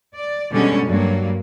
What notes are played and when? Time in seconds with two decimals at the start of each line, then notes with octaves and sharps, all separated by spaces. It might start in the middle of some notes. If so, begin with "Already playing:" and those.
0.15 D5
0.52 B2 D3 G3 G#3 C#4
0.85 G2 F#3 A#3